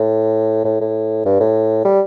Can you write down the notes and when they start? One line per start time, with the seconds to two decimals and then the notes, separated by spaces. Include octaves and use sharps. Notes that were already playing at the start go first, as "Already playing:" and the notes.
Already playing: A2
0.65 A2
0.81 A2
1.26 G2
1.40 A2
1.85 G3